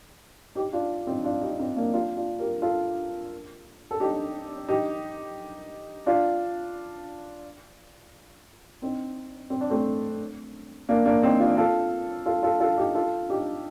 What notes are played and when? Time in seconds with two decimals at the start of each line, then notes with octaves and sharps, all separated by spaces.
0.55 D#4 G4
0.73 D4 F4
1.07 C4 D#4
1.24 D4 F4
1.41 D#4 G4
1.59 C4 D#4
1.77 A#3 D4
1.94 D4 F4
2.17 D4 F4
2.39 G4 A#4
2.62 F4 A4
3.91 A4
4.00 D#4 G4
4.68 D#4 G4
6.06 D4 F4
8.82 C4 D#4
9.50 C4
9.61 D4
9.70 A3 C4
10.89 A#3 D4
11.05 A#3 D4
11.23 C4 D#4
11.40 D4 F4
11.57 F4 A4
12.26 F4 A4
12.43 F4 A4
12.60 F4 A4
12.77 D#4 G4
12.95 F4 A4
13.29 D#4 G4